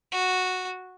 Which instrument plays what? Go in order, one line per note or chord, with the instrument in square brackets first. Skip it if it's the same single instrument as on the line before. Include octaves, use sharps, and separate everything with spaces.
[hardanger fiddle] F#4